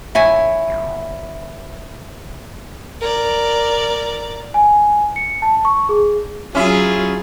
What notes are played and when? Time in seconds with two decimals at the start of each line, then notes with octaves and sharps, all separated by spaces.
0.15 A#1 E4 C#5 G#5
0.68 G1
3.01 A#4 D5
4.54 G#5
5.16 C#7
5.42 A5
5.65 C#6
5.89 G#4
6.55 F#3 C#4 E4 F4 G#4